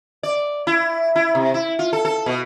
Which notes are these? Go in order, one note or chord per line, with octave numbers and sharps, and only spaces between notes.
D5
E4
E4
C3
E4
F4
A4
A4
B2